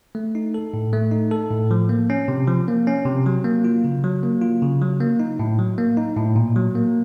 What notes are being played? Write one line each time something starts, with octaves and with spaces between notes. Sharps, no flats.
A3
D#4
A4
A2
A3
D#4
A4
A2
F3
A#3
C#4
C3
F3
A#3
C#4
C3
F#3
A#3
F4
C#3
F#3
A#3
F4
C#3
F#3
A#3
D#4
A2
F#3
A#3
D#4
A2
A#2
F#3
A#3